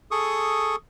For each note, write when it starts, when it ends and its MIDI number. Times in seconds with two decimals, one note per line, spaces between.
0.11 0.76 68
0.11 0.76 69
0.11 0.76 85
0.11 0.76 87